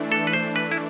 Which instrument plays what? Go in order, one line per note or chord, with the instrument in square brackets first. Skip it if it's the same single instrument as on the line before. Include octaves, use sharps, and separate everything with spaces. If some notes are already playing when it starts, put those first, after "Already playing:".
Already playing: [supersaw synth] E3 A3 D4
[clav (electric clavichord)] A4
B4
C5
B4
E4